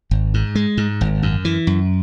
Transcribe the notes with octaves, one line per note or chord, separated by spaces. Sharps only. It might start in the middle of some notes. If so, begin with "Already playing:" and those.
G#1
G#2
G#3
G#2
G#1
F#2
E3
F#2